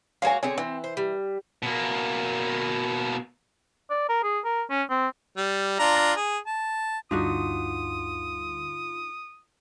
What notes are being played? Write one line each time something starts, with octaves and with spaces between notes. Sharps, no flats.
G#3 A#3 F#4 C#5 F5 G#5
D3 C4 G#4 C#5
E3 C4
C5
G3
B2 A#3
D5
A#4
G#4
A#4
C#4
C4
G3
D4 F4 A#5
G#4
A5
D2 G2 D3 D4 D#4 F4 F#4 D#6